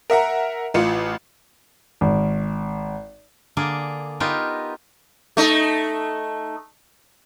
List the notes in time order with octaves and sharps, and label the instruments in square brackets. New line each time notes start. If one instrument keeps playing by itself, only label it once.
[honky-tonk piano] A#4 E5 F#5 A#5
A1 F4 C#7
[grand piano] G#1
[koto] D3 A#3 G#4 D5
B3 D#4 F4 G4 A#4
[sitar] A3 D#4